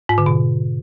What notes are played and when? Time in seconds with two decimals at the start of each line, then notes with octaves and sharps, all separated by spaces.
0.09 G#2
0.18 D3
0.26 B2